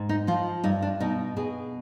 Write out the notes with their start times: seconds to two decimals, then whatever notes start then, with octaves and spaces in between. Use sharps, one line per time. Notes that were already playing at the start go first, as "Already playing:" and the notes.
Already playing: G#2
0.09 D#4
0.27 F3 F4
0.64 G2 D#4
0.82 D4
1.00 B2 D#4
1.37 B2 G#4